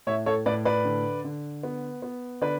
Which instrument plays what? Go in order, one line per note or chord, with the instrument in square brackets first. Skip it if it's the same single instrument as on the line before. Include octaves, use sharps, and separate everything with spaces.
[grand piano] A2 C#5 E5
A4 C#5
A2 B4 D5
B4 D5
D3
D3
B3
B3
D3 B4 D5